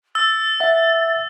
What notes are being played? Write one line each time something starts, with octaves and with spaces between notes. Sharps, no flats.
E6 A6
E5 F#5